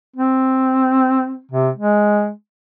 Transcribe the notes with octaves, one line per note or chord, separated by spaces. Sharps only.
C4
C3
G#3